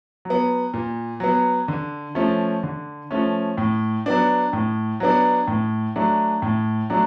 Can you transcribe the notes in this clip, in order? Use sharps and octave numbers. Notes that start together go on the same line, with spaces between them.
F#3
B3
A#2
F#3 B3
D3
F3 A3 C#4
D3
F3 A3 C#4
A2
F#3 B3 D4
A2
F#3 B3 D4
A2
F#3 A3 D4
A2
F#3 A3 D4